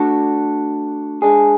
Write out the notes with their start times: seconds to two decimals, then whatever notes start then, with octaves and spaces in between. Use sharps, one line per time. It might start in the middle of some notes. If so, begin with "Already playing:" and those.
Already playing: A3 D4 F#4 A4
1.22 G#3 D4 G#4